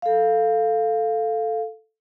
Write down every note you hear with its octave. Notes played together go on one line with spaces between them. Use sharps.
A4 F5